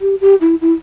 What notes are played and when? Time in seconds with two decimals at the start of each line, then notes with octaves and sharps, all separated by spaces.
0.01 G4
0.21 G4
0.41 E4
0.61 E4